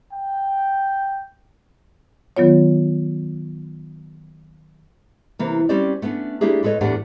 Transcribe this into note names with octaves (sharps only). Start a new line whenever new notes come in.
G5
D#3 F#3 B3 F4 C#5
C3 E3 A#3
G3 C4 C#4 G4 C5 D5
A3 B3 C#4 D4
A3 A#3 D4 E4 G4 G#4
A2 G#3 A4 B4 C#5 D#5
E2 A2 D4 G4 D5 F#5